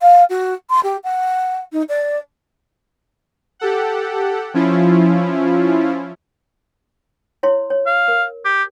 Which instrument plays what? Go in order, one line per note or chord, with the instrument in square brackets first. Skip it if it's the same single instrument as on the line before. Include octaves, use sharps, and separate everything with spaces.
[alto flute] F5
F#4
C6
G4
F#5
D#4
D5
[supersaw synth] G4 A4 F#5
F3 C#4 E4 F4
[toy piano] E4 C#5 C6
C#5
[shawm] F5
[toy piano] A#4
[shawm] G4